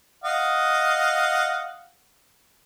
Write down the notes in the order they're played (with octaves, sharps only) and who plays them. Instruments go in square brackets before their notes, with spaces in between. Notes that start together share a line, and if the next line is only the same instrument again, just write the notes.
[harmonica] D#5 F5 F#5